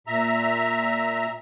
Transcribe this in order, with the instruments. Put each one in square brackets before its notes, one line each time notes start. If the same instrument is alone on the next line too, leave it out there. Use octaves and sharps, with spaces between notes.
[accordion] A#2 E5 A#5